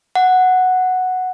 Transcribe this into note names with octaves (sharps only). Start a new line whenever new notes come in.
F#5